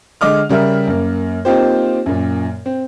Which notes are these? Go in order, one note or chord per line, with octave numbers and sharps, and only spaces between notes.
D3 G#3 D#5 D6 F6
C#3 G3 A#4 E5
F#2 A#3
A#3 C4 D#4 F4 G4 C5
F#2 A#2
C4